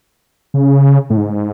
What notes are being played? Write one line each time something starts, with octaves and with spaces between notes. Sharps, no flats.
C#3
A2
G#2